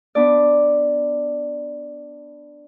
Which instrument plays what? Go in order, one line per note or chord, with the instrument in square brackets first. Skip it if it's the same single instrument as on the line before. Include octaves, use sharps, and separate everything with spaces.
[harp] B3 D4 D5